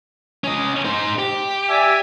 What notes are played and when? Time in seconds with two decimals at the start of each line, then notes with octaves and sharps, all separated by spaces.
0.44 C#4 D#5
0.85 D#4 C5
1.19 G4
1.69 D5 E5 G#5